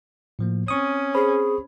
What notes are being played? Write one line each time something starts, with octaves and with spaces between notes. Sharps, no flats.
A2 F3 A#3
C4 C#4 C#6 D#6
G#4 C5 B5